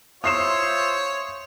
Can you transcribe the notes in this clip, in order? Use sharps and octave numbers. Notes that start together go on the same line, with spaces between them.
F4 C5 C#5 E5 D#6 C7 E7